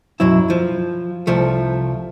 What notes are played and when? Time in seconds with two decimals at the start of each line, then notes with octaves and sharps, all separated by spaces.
0.20 B1 F#2 F#3 E4
0.50 F3
1.27 C2 F3 A3